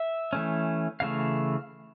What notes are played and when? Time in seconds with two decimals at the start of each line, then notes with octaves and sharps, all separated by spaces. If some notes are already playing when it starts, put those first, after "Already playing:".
Already playing: E5
0.33 E3 A3 C#4
1.00 C#3 E3 A3 F5